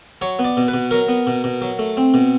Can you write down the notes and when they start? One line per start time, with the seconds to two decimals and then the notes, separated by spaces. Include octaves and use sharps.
0.21 F#3 C#5
0.39 B3
0.44 D5
0.57 B2
0.68 B4
0.74 B2
0.91 F#3 A#4
1.08 B3
1.27 B2
1.44 B2
1.61 F#3
1.79 A3
1.97 C4
2.14 B2